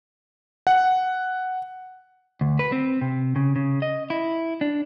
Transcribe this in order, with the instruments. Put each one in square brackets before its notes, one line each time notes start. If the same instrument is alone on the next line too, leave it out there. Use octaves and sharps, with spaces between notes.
[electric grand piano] F#5
[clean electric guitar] D2
B4
C4
C3
C#3
C#3
D#5
E4
D4